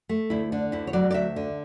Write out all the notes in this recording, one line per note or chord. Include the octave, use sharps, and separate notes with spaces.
A3
D2 E4
D3 D4
D2 E4
C#5
F#3 D5
D5
D2 E5
D3